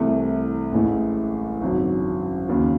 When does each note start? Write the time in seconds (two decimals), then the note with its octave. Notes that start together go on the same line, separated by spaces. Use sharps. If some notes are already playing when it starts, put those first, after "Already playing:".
Already playing: C2 C3 E3 A3
0.72 A1 A2 G#3
1.61 G#1 F#2 C#3 F#3
2.48 D#2 C#3 F#3